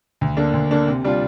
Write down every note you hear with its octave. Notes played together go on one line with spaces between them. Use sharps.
D2
D3 A#3 D4
D2
D3 A#3 D4
C3
G3 D4 F4